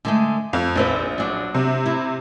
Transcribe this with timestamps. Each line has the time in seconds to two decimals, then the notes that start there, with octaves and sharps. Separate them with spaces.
0.05 D3 G#3 A3
0.53 F2 F5
0.75 A#1 D#2 C4 B4
1.18 F#3 D4
1.55 C3
1.86 E4